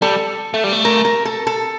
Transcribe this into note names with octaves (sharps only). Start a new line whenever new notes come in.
G3 A4
A3
G3
A3
A#4
A#4
A4
A4